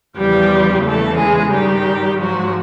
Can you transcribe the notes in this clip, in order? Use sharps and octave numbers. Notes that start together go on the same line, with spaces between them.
E2 C#3 F3 G3 G4
E2 C#3 E3 A3 A4
G#3 G#4
G2 D#3 G3 G4
G#2 F3 F#3 F#4